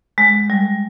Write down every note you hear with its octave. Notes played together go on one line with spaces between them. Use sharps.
G#3
G3